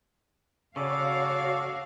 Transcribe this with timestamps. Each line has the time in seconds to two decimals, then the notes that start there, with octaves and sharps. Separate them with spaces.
0.76 C#3 F#4 A4 C#5 D5 F5